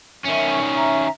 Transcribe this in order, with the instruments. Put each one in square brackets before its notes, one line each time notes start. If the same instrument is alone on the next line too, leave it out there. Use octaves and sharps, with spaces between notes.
[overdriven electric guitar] D#3 C#4 [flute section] E5 C#6
[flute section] E5 A#5